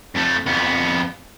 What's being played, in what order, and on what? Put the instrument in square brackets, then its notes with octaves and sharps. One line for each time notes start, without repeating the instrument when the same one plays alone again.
[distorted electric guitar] F2 A3
F2 B3